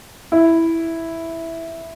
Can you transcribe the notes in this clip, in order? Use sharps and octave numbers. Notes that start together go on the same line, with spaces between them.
E4